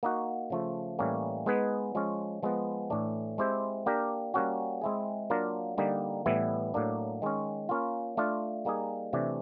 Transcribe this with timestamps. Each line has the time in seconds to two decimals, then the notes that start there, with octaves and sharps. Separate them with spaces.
0.03 A#3 D#4 F#4
0.50 C#3 F3 A3
0.99 A2 E3 G3 A#3 C#4
1.46 G#3 B3 D#4 G#4 B4
1.95 F3 G#3 C#4
2.43 F3 G#3 B3
2.90 A2 E3 A3 D4
3.38 G#3 C4 E4 G4 C5
3.86 A#3 D4 G4 A#4
4.34 G3 A#3 C#4 F#4
4.81 G#3 C4 E4 G#4
5.30 F#3 A#3 D4 F4 A#4
5.78 D3 G3 A#3 D#4
6.26 A2 E3 G3 B3 E4
6.74 A2 F#3 A#3 D4
7.22 D#3 G#3 C#4
7.69 A#3 C#4 F4
8.17 A3 D4 F4
8.65 G3 A#3 D#4 G#4
9.13 C3 E3 A3 D4